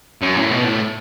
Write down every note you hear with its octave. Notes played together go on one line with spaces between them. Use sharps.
F#2
A2
B2
A2